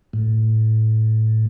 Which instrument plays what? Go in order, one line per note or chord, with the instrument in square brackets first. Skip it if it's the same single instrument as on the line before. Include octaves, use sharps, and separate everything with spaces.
[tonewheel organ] A2